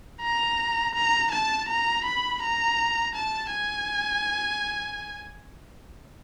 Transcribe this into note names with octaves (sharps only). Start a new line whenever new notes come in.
A#5
A#5
A5
A#5
B5
A#5
A5
G#5